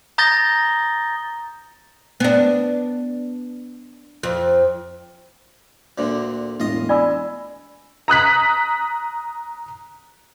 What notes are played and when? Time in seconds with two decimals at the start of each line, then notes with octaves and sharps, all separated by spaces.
0.18 A#5 D#6 G6 A6 A#6 G7
2.20 B3 D4
4.23 F2
5.98 D2 A#2 D3
6.60 E1 A2 F4 D#5
6.89 D5 G#5 B5 E6
8.08 A#5 D#6 F#6 B6